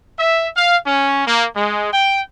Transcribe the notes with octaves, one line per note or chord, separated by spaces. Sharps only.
E5
F5
C#4
A#3
G#3
G5